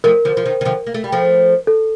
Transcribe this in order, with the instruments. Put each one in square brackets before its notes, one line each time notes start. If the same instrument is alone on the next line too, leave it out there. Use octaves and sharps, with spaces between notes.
[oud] F3 A3 [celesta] A#4
[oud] D3 F3
F3
D#3
D#3
D3 F3
A#3
A3
G3
F3 A3
[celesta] A4